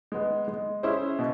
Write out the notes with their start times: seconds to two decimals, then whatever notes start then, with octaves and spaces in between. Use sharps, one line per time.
0.12 G#3 B3
0.48 G#3
0.83 C#4 E4 G#4 C5
1.19 B2